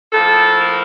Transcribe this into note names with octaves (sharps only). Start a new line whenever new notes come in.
A2 F3 A#3 A4
A#4